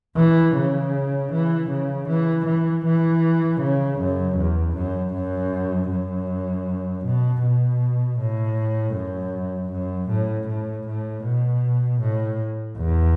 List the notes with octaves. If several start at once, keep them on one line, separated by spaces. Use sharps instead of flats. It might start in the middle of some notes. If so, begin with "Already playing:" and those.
E3
C#3
E3
C#3
E3
E3
E3
C#3
F#2
E2
F#2
F#2
F#2
B2
B2
A2
F#2
F#2
A2
A2
A2
B2
A2
E2